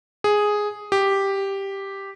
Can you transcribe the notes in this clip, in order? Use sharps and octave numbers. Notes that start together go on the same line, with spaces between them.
G#4
G4